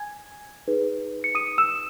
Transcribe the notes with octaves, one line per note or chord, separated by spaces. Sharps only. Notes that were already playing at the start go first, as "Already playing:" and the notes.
Already playing: G#5 G#6
D#4 G#4 B4
C#7
D#6 D#7
E6 E7